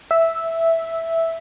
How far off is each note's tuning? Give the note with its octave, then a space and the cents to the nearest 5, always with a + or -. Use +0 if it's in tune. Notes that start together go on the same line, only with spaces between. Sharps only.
E5 +0 E6 -10